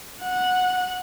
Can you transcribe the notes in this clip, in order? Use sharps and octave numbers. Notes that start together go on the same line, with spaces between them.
F#5